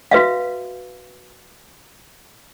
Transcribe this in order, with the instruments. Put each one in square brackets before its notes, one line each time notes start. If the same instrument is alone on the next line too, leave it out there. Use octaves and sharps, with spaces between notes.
[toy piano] F#4 B4 E5 F5